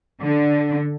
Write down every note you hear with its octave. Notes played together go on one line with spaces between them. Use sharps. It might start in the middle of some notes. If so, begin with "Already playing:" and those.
D3